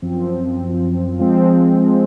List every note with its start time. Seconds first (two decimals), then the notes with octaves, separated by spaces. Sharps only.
0.02 F#2 F3 C4
1.19 F3 G#3 C4